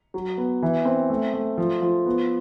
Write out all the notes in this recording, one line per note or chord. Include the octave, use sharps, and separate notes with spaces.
F#3
B3
E3
C4
A3
A3
F3
F3
B3